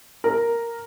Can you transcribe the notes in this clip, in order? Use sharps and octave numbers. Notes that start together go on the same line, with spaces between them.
A#4